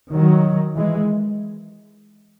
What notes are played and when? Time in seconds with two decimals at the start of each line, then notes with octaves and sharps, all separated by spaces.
0.13 D#3 F#3
0.74 E3 G#3